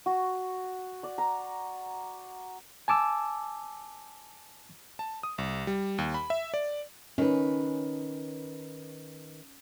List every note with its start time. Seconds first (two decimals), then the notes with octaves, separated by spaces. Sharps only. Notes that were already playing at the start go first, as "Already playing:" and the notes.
0.06 F#4
1.03 D5
1.18 A#5
2.88 G#5 A5 D6 E6
4.99 A5
5.23 D#6
5.38 C2
5.67 G3
5.98 D#2
6.14 B5
6.30 E5
6.54 D5
7.18 D#3 C#4 B4